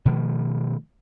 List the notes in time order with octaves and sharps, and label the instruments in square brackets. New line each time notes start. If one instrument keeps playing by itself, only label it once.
[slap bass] B2 D#3 F3 A3